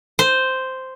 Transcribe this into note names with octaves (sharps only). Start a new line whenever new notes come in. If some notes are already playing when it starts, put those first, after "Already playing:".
C5